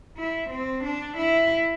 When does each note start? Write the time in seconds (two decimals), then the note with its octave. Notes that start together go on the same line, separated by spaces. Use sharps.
0.17 E4
0.50 C4
0.84 D4
1.18 E4